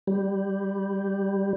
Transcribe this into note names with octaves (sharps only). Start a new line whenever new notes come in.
G3